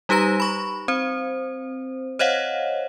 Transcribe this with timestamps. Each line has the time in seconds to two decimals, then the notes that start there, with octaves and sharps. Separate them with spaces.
0.09 G3 D#4 G4 B4 A#5 A#6
0.40 B5 C#6
0.88 C4 C5
2.19 C5 C#5 D#5 F5 F#5